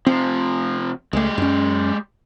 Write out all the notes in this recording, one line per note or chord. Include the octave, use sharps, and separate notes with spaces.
C3 F3 C4
C#2 G#3 A3 G4
F#2 C#4